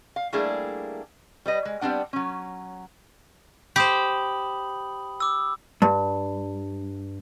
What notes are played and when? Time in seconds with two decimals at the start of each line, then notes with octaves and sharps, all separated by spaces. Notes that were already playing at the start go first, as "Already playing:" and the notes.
0.16 F5
0.33 G3 A3 A#3 D4 E4 G#4
1.46 G3 B4 D#5
1.65 G#3
1.81 G3 B3 C4 D4 F#5
2.13 F#3 C#4
3.76 G4 C5 B5 D#6 F#7
5.20 D6 E6
5.82 G2